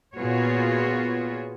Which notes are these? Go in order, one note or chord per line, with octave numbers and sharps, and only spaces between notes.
A#2 B3 F4 F#4 G#4 C#5